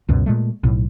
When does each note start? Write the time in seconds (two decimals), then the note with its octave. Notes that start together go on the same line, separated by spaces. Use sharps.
0.09 C#2 F#2 B2
0.26 A#2 G#3 A3
0.63 B1 A2